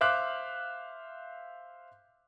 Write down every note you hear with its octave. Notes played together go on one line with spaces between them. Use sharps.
C5 E5 F5 D6 F#6